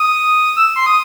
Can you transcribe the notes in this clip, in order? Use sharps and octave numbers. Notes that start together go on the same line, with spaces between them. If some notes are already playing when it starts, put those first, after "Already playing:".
Already playing: D#6
E6
C6
D#6